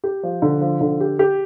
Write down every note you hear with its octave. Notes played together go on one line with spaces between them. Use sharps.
G4
F3
D3
F3
D3
G4
G4